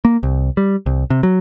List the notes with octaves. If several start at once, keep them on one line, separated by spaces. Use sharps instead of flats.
A#3
C2
G3
C2
C3
F#3